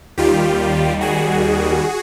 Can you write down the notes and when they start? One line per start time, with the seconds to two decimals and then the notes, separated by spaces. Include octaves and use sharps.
0.18 D#2 D#3 G3 F4 G4
1.01 F#4 G#4